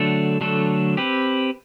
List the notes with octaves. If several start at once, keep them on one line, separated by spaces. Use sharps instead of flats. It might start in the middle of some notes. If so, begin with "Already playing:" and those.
Already playing: D3 F#3 A3 D4 A4
D3 F#3 A3 D4 A4
C4 G4 B4